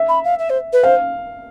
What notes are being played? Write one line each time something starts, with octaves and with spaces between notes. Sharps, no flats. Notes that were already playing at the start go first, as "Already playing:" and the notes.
Already playing: E5
B5
F5
E5
C5
B4
C5 F5